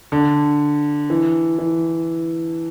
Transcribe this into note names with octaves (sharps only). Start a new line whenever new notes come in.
D3
E3
E3